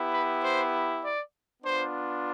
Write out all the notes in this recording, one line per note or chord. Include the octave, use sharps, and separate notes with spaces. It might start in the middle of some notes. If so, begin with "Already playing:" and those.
Already playing: B3 E4 G4
B4
C5
D5
B3 D4 F4 C5